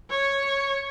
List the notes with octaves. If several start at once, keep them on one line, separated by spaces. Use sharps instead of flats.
C#5